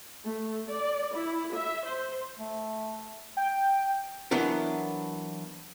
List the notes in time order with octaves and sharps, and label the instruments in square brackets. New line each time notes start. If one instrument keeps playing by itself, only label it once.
[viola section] A3
D5
E4
E5
C5
[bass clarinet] A3
[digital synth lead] G5
[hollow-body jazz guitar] E3 F#3 B3 D4 A#4